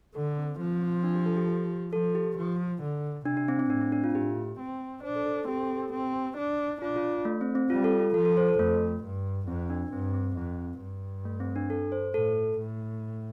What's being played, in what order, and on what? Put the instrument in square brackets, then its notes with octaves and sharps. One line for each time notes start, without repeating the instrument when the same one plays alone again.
[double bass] D3 [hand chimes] A4
[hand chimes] C4
[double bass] F3 [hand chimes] C4
[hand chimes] C4
D4
G4
A4
G4
G4
[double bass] F3 [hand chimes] A4
[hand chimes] G4
[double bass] F3
D3
[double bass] C3 [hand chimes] D4
[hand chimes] D4
C4
C4
[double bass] A2 [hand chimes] D4
[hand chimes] C4
D4
F4
[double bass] A2 [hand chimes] G4
[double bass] C4
[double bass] D4 [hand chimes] C5
[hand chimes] A4
A4
A4
[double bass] C4 [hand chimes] G4
[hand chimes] A4
G4
[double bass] C4 [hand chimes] G4
[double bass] D4
[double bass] D4 [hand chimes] F4
[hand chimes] F4
A3
C4
C4
[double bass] G3 [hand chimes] F4
[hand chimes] A4
F4
[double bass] F3 [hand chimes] A4
[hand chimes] A4
C5
A4
[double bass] F2 [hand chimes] A3
[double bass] G2
[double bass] F2 [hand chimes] C4
[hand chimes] D4
[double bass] G2 [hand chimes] C4
[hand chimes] C4
[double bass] F2 [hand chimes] C4
[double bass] G2
[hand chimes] A3
C4
D4
A4
C5
[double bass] A2 [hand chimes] A4
[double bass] A2